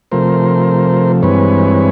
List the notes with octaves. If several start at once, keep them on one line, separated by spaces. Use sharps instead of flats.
C3 F3 A3 A#4 C5
G2 E3 G#3 C4 B4 C#5